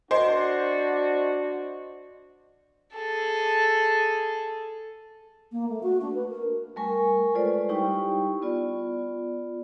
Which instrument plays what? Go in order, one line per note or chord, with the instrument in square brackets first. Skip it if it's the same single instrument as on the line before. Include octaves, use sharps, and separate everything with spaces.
[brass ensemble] D4 F#4 [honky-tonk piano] C5 [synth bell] D#5
[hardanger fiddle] G#4 A4
[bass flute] A#3
A3
F#4
D4
B4
A#4
[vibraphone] G3 A3 A#4 G#5 C#6
G#3 F4 A4 B4 C5 D5
G3 D#4 E4 G4 G5 C#6
B3 F4 D5